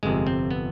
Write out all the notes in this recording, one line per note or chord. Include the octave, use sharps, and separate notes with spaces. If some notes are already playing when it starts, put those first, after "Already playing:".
G1 F2 C3 G#3
C4
B3